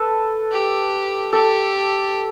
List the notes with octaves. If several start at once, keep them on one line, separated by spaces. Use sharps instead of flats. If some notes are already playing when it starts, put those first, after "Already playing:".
Already playing: A4 B4
G4
G4 A4